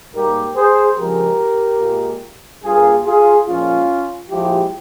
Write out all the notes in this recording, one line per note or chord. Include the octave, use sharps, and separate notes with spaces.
G#2 G3 A#3 G4 A#4
G#4 C5
F2 C#3 F3 G#3 G4 A#4
A#2 G#3
G2 G3 A#3 F4 G#4
F4 G#4
A#2 F3 G#3 C#4 F4
A#2 F3 G#3 E4 G4